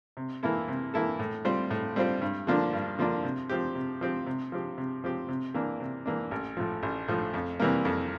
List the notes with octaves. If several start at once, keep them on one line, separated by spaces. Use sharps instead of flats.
C3
E3 A#3 E4 A4
C3
E3 A#3 E4 A4
A2
G3 C4 F4 C5
A2
G3 C4 F4 C5
G2
D3 F3 A#3 D4
G2
D3 F3 A#3 D4
C3
F3 C4 G4
C3
F3 C4 G4
C3
F3 C4 G4
C3
F3 C4 G4
C3
E3 A#3 D4
C3
E3 A#3 D4
A1
A2 F3
A1
A2 F3
F2
C3 E3 G3 A#3
F2